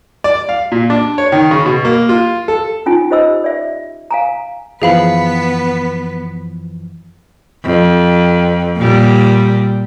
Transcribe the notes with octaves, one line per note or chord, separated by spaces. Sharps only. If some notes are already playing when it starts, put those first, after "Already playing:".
D5
F5
A#2
D4
C#5
D#3
C#3
B2
A#3
F4
A4
C#4 D#4 F4 G#5
D#4 G4 C5 D#5 B5 E6
D5 E5
F5 G#5 A#5
F#2 E3 F3 B3 G#4 B4 F5 B5
F2
A#2 G3